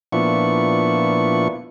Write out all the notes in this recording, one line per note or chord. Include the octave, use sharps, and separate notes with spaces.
A#2 F3 B3 D4 E4 C#6